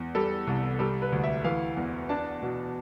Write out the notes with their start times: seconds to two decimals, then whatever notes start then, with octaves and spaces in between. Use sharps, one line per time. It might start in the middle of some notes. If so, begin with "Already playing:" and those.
Already playing: E2
0.15 G3 A4
0.47 C2
0.79 G3 A4
1.02 B4
1.12 D2
1.24 E5
1.44 E3 F5
1.77 E2
2.09 D4 A5
2.42 B2